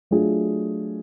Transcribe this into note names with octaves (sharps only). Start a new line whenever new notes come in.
F#3 A3 D4 F4 G#4